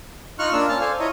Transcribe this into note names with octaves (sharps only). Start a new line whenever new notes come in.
D#4 F4 C#6 F6 F#6
A#3 D4 F4 E6
C#4 F4 A5 F6
A4 C5 D5 F5 G#5
E4 F4 C#5 D#5 A#5